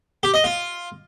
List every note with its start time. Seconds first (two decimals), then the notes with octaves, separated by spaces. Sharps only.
0.23 G4
0.34 D#5
0.44 F4